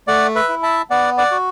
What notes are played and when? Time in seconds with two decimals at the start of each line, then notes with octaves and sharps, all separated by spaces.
0.08 A3 D5 F#5
0.36 B4 E5
0.49 E4
0.63 E5 A5
0.90 B3 D5 F#5
1.18 D5 F#5
1.31 F#4